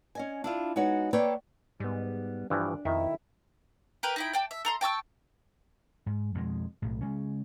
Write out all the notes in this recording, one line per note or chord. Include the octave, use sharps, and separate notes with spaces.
C#4 D#5 G#5
D4 E4 F4
G#3 B3 D#4 F#4 C#5
A#3 A4 B4 C#5 D5 G5
G#2 G3 B3
G2 E3 F3 D4
F2 B2 D#3 E4 E5
G4 A#4 B4
D#4 E4 G5
D5 G5 A5
E5
A4 A#5 C6
G5 A5 C#6 E6
G#2
F2 B2 G#3
B1 A2
C#3 G#3 C#4